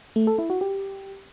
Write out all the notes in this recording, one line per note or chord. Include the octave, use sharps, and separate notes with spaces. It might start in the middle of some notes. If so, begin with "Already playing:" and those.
A3
A4
E4
F#4
G4